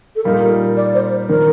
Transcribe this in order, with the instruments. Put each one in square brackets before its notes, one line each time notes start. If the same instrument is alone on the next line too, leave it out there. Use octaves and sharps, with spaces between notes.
[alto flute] A4
[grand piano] A#2 G3 A#3 D#4 [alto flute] A#4
[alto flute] D5
C5
[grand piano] D#3 [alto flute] A#4